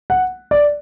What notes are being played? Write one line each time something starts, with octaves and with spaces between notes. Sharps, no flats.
F#5
D5